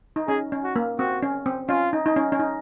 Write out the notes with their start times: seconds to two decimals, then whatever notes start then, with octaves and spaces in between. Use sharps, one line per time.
0.16 D#4
0.28 C#4 G#4
0.52 C#4
0.64 F#4
0.76 A#3
0.99 C4 F#4
1.23 C#4
1.46 C4
1.69 C#4 F4
1.93 D#4
2.06 D#4
2.16 C#4
2.32 C#4
2.40 D#4